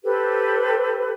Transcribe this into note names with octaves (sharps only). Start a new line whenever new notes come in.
G4 A4 B4 C5